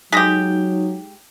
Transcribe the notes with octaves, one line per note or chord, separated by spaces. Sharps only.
F#3 G#3 D#4 G4 D#6 A#6 B6